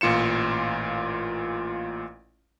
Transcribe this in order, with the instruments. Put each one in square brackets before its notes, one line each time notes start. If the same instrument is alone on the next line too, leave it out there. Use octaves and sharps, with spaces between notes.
[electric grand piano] A1 A#2 F4 C#7 E7